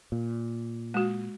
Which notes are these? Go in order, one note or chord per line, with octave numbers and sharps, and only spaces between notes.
A#2
G#3 F#4